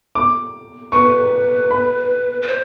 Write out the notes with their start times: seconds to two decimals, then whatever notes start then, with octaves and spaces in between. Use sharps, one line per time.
0.15 D6
0.92 B4 C#6
1.71 B5
2.42 B4
2.48 C5